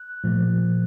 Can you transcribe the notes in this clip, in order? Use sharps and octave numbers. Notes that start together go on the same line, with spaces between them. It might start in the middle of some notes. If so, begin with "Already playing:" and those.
Already playing: F#6
A#2 F3 A3